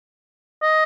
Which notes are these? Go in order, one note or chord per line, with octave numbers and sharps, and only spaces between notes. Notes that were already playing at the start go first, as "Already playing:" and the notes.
D#5